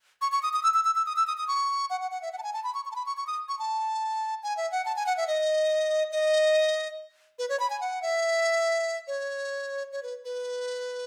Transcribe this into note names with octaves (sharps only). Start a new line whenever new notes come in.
C#6
C#6
D#6
D#6
E6
E6
E6
E6
D#6
E6
D#6
D#6
C#6
F#5
F#5
F#5
E5
F#5
A5
G#5
A5
B5
C#6
C#6
A5
B5
C#6
C#6
D#6
C#6
A5
G#5
E5
F#5
A5
G#5
F#5
E5
D#5
D#5
B4
C#5
B5
G#5
F#5
E5
C#5
C#5
B4
B4